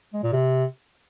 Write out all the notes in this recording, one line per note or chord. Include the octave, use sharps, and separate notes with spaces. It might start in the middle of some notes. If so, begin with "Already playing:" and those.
G#3
A#2
C3